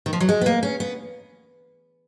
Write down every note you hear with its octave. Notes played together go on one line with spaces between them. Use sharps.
D#3
F3
F#3
G#3
B3
A#3
C#4
B3